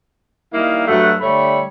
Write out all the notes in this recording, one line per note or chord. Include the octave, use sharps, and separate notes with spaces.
D#3 G3 A#3 E4 D#5 F5
G2 F#3 A3 F#4 F#5
D3 G3 A3 C#5 B5